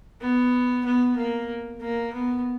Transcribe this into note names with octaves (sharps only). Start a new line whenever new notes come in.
B3
B3
A#3
A#3
B3